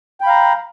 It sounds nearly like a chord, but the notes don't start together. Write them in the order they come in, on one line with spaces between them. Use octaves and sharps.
G5 B5 F5 A#5